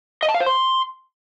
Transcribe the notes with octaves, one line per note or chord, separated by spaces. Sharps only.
D#5
A5
F5
C5
C6